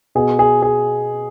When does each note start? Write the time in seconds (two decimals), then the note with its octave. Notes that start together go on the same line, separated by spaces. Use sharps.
0.15 B2 G#4
0.39 G#4
0.62 G#4